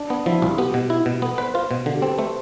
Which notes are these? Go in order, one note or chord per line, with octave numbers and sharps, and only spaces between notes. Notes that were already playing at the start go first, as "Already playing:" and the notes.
Already playing: D4
B3
F3 E4
C2 F4
B3 G4
B2
E4
B2
B3 A4
B4 C5
F4 C5
B2
D3
G4
C4 A4
B4
A3 C5